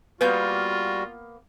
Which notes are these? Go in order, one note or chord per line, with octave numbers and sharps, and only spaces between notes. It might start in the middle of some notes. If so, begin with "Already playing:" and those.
G3 A#3 B3 F4 F#4 B4 G6